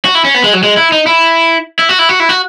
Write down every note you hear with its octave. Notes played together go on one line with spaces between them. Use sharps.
F#4
E4
C#4
B3
G#3
F#3
G#3
E4
D#4
E4
E4
F#4
E4
F#4
E4
F#4